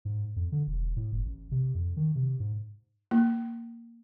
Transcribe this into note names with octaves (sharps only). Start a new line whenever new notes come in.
G#2
F2
D3
E1
A2
F#1
A1
C3
F2
D#3
C3
G#2
A#3